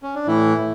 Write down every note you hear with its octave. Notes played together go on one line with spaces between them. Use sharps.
C#4
D4
A2 E3 E4
A2